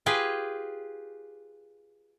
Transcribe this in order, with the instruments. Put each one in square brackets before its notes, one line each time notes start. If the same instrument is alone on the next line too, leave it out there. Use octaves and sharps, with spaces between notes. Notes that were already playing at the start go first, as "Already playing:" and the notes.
[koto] F4 G4 G#4 B4